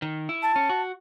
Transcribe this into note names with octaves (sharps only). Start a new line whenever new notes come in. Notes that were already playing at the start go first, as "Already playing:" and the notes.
D#3
E4
A5
C#4
F#4